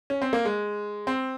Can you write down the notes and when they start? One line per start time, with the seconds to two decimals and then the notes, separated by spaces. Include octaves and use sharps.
0.10 C#4
0.22 C4
0.33 A#3
0.45 G#3
1.07 C4